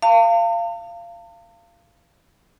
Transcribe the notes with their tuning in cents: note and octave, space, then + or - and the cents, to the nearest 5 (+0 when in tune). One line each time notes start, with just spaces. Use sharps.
F5 -20 A5 +45